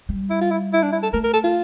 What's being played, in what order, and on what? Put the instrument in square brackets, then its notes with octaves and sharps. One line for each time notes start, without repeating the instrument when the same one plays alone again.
[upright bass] G3
[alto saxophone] E4
F4
E4
E4
D4
E4
A4
[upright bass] A3 [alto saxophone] A#4
[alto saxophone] A#4
A4
F4